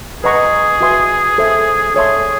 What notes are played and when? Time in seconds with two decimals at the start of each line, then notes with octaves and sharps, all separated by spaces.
0.24 G#4 B4 D#5 F#5 A#5 C#6
0.81 F#4 B4 E5 G#5 C6
1.38 A4 C5 E5
1.95 G#4 A4 C#5 E5 A5 C6